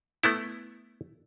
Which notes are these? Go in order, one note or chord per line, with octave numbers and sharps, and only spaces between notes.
A3 B3 E4